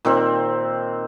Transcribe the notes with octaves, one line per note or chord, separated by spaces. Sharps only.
A#2 D#3 C4